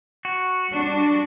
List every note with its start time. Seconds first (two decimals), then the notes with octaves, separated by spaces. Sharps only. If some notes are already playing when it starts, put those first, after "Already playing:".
0.25 F#4
0.69 G3 D4